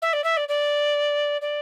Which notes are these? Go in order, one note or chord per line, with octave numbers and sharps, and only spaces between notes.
E5
D5
E5
D5
D5
D5